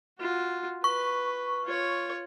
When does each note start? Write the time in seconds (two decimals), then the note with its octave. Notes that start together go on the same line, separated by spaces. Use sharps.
0.19 F4 F#4
0.84 B4 C#6
1.64 F4 C#5